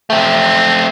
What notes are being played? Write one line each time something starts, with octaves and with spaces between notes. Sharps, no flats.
A3 C4